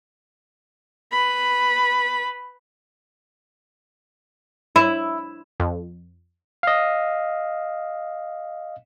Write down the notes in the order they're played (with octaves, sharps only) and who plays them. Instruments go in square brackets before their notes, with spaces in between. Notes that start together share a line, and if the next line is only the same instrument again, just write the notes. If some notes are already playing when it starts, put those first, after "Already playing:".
[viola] B4 B5
[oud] E4
[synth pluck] F2
[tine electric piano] D#5 F5